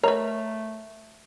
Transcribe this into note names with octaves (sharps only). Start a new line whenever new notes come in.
A3 A#4 B4 C#5 D#5 A#5 C#6